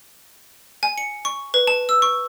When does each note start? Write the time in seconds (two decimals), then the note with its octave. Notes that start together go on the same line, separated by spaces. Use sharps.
0.83 G#5
0.98 C#7
1.25 C#6
1.54 B4
1.67 A5
1.89 E6
2.02 C#6